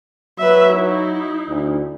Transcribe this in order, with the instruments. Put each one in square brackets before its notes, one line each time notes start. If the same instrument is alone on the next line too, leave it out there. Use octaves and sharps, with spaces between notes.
[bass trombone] F#3 [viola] B4 E5
[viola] D#4 E4
[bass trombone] D2